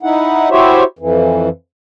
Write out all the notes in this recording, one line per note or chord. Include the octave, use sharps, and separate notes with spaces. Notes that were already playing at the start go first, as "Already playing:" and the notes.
D#4 E4 F#5
E4 F#4 G4 C5 C#5 E5
F2 E3